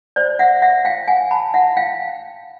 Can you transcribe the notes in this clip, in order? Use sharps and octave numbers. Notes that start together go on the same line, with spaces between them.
C5 D5
E5 F#5
E5 F#5
F5 G5
F#5 G#5
A5 B5
E5 F#5
F5 G5